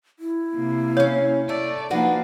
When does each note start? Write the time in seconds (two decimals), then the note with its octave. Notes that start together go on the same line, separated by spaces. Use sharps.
0.19 E4
0.54 C3 A#3
0.97 C#4 C#5 F5
1.49 A3 D5
1.90 F3 A#3 D4 D#4 F#4 B4